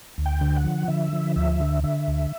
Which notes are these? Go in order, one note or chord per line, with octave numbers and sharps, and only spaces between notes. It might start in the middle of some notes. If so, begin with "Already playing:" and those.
D2
G5
D3
F#5
F3
D3 E5
F3
D2 E5
D3
D3 E5
D2